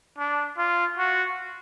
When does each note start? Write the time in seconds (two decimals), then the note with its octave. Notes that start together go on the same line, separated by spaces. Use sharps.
0.19 D4
0.58 F4
0.98 F#4